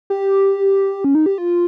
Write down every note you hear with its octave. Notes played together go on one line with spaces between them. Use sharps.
G4
C#4
D#4
G4
F4